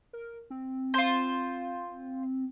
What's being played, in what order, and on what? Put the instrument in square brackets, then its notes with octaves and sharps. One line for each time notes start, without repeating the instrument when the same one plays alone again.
[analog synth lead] A#4
C4
[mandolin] F4 C5